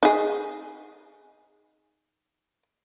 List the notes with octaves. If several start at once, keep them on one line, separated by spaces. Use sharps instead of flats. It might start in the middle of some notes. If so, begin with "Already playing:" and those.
D#4 G#4